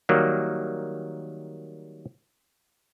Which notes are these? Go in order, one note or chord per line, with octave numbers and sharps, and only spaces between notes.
D#3 F#3 G3 A#3